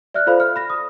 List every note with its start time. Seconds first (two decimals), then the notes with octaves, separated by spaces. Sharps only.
0.14 D5 E5 F6 F#6
0.27 F4 A4 C5 D5 F5 B5
0.40 F6
0.56 B5 A#6
0.70 D#6